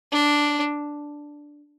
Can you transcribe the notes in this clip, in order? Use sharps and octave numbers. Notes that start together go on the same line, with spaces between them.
D4